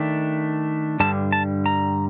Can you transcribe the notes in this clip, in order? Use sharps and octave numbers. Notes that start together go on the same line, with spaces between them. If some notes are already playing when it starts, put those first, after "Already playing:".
Already playing: D#3 A3 D4
G2 D3 G3 A5
A5
A#5